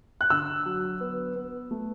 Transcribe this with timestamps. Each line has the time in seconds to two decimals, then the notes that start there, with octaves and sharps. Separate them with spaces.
0.21 F#6
0.30 D3 E6
0.66 F#3
1.00 B3
1.36 B3
1.71 A3